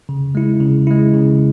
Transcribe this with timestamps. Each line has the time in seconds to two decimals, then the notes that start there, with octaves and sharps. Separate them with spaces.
0.09 C#3
0.35 G#3 E4
0.60 C#3
0.87 G#3 E4
1.14 C#3